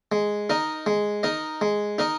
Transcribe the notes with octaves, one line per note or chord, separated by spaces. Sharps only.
G#3
D#4 A#4 D#5
G#3
D#4 A#4 D#5
G#3
D#4 A#4 D#5